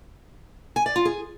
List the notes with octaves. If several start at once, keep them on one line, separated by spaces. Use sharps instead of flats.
G#5
D5
F4
G#4